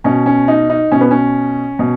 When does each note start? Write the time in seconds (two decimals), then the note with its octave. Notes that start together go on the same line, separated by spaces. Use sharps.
0.04 B2 C#4
0.26 C#4
0.48 D#4
0.70 D#4
0.91 B2 C#4
1.01 B3
1.11 C#4
1.79 B2